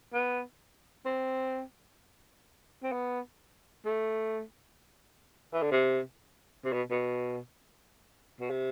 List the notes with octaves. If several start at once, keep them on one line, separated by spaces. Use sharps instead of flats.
B3
C4
C4
B3
A3
E3
D3
C3
C3
B2
B2
B2
C3